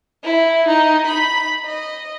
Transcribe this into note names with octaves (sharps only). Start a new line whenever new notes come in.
E4
D#4
B5
D#5